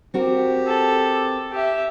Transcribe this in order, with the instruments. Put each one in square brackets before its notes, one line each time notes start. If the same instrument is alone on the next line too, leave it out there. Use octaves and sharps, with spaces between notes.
[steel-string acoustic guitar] C4 F#4 A#4 [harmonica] G4
[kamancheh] A4
G4 E5